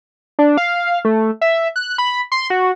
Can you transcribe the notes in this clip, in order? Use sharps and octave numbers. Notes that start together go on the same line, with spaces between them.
D4
F5
A3
E5
F#6
B5
C6
F#4